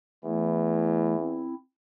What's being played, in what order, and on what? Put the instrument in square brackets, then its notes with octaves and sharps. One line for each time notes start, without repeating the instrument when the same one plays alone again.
[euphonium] E2 [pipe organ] E3 A3 E4
[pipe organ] C4 E4